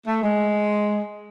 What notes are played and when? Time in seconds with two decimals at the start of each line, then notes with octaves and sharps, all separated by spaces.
0.06 A3
0.23 G#3